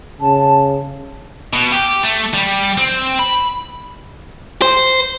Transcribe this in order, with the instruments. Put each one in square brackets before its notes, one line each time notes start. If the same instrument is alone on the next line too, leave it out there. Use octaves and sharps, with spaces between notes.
[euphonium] C#3 [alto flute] A5
[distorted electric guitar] B2
G4
A3
G3
C4
B5
[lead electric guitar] C5